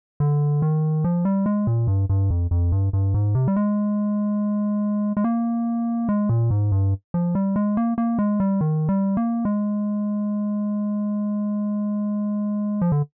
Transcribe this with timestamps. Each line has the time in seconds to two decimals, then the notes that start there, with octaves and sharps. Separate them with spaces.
0.20 D3
0.62 D#3
1.04 F3
1.25 G3
1.46 G#3
1.67 A#2
1.87 G2
2.09 G2
2.30 F2
2.51 F2
2.72 G2
2.93 G2
3.14 G#2
3.35 C3
3.48 G3
3.56 G#3
5.17 G#3
5.24 A#3
6.09 G#3
6.29 A#2
6.51 G#2
6.72 G2
7.14 F3
7.35 G3
7.56 G#3
7.77 A#3
7.98 A#3
8.19 G#3
8.40 G3
8.61 D#3
8.89 G3
9.17 A#3
9.45 G#3
12.81 F3
12.92 D3